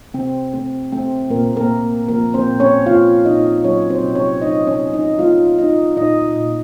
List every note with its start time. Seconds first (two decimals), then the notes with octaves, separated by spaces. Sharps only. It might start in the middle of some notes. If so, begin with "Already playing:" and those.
0.14 C3 C4
0.53 A3 C4
0.92 A3 C4
1.30 A#2 A#3 A#4
1.56 A#3 A#4
1.69 A#2
2.08 F3 A#3 A#4
2.34 C4 C5
2.48 A#2
2.60 C#4 C#5
2.86 A#3 F4 F5
3.25 A#2 D#4 D#5
3.64 F#3 C#4 C#5
3.89 C4 C5
4.04 C3
4.15 C#4 C#5
4.42 A3 D#4 D#5
4.67 C#4 C#5
4.80 C3
4.94 D#4 D#5
5.19 A3 F4 F5
5.58 A3 D#4 D#5
5.97 A#2 D#4 D#5
6.36 A#2